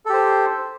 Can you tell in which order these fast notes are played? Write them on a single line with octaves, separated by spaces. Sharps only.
A4 G4 C5